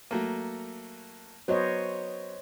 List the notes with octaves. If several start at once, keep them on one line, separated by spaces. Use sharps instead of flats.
F#3 A3 A#3
F#3 B3 C5 C#5 D#5